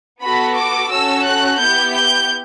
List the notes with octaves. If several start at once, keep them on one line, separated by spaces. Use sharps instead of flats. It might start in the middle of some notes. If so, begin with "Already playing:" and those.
B3 F#4 A4 B5
D6
C#4 F#4 A4 E6
F#6
B3 E4 G4 G6
G6